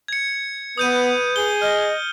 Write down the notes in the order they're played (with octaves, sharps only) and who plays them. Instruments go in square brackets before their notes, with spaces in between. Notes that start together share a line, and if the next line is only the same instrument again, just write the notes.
[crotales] G#6 C#7
[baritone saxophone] B3 [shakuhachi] B4 [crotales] D#6 G6 D#7
[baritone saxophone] G#4 [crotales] G7
[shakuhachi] D#5 [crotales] F6